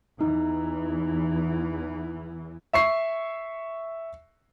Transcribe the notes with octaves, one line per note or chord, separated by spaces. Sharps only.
E2 E3 D#4
E5 C#6 C7